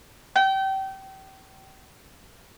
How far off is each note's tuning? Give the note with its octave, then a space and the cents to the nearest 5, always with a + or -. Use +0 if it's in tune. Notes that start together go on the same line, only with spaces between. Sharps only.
G5 -30